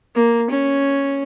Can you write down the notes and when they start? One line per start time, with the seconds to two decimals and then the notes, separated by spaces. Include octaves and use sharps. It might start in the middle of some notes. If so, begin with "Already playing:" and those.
0.15 A#3
0.50 C#4